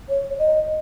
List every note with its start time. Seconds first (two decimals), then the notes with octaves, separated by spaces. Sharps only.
0.09 C#5
0.39 D#5